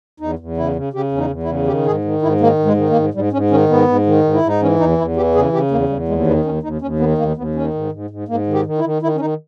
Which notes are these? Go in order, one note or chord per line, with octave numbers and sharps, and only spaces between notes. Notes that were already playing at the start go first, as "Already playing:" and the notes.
E2 D#4
E2
C#3 E4
C#3
C#3 G4
E2 C#4
D#4
E2
E4
C#3
D#3 G4
G#2 G#4
D#3
G#2 E4
D#3 A#3
G#2
G#3
D#3
A#3
G#2
G#2 G3
G#2 C#4
D#3 C#4
G#2 B3
G#2
D#3
G#2
E4
G#2
D#4
E3 C#4
E2 D#4
E2 E4
E3 G4
C#3 G#4
C#3 G4
E2 A#3
E2 G3
D#2 G#3
D#3 B3
D#2 C#4
D#2 D#4
D#2 C#4
D#3 B3
D#2 A#3
D#2 B3
D#3 C#4
G#2
G#2
G#2
G#2 A#3
D#3
G4
D#3
E4
D#3
D#3 E4
C#4
D#3 D#4